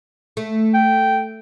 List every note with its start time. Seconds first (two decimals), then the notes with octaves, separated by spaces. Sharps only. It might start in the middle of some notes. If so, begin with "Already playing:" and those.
0.37 A3
0.74 G5